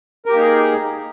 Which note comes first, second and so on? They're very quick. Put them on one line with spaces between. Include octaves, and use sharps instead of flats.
A#4 G4 A#3 D#4 G#4